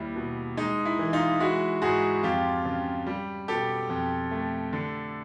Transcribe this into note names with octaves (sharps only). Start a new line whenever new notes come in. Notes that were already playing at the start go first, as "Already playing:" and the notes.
Already playing: D#2 G3 E4
B2
G#3 D#4
E4
E3
D#4 F4
G#3 E4 F#4
G#2 F#4 G#4
F2 F4 G4
C#3
G3
B2 G4 A4
F2
A3
D3